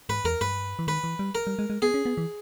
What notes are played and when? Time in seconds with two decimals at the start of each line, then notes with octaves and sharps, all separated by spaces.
0.09 G#2 B4
0.24 E2 A#4
0.41 G2 B4
0.79 E3
0.87 D#3 B4
1.04 E3
1.19 G3
1.35 A#4
1.47 G3
1.59 G#3
1.70 G#3
1.82 B3 G#4
1.94 C#4
2.06 B3
2.17 E3